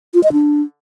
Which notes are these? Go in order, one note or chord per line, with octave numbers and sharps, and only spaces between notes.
F4
D#5
D4